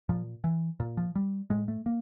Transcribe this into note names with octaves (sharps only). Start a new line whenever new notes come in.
A#2 F3
E3
A#2
F3
G3
A2 G#3
A3
A#3